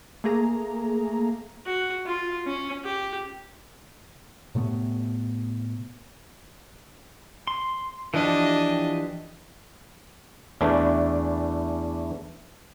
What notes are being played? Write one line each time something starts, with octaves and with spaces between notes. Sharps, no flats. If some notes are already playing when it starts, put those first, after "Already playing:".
A3 A#3 G#4 A#5
F#4
F4
C#4
G4
A2 C3 A3 B3
C6
E3 F3 D4 G4 D#5
E2 E3 A3 C#4 D4